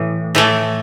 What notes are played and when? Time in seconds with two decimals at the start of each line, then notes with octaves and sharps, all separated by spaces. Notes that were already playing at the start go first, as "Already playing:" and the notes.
Already playing: A2 E3
0.35 A2 E3 A3